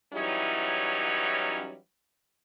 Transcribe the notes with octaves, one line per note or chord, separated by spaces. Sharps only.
E3 F#3 G3 C#4 D#4 E4